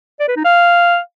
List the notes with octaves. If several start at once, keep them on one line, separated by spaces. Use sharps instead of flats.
D5
B4
D#4
F5